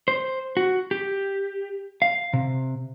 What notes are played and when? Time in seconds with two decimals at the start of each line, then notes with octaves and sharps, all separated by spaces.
0.08 C5
0.57 F#4
0.91 G4
2.02 F5
2.33 C3